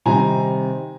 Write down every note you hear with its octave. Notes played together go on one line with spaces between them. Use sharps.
C3 D#3 G3 C4 D#4 G#5 A#5